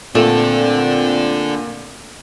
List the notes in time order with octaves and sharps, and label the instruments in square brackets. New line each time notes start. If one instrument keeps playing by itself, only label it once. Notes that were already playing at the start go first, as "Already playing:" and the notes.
[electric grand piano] A#2 [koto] A3 [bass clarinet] C4 [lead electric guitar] D4 A4